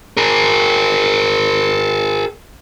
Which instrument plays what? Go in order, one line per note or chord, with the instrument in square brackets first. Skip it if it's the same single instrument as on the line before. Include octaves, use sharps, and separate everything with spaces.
[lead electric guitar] G#4 A#4